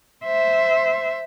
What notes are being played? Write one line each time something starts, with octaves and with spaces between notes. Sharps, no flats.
C5 E5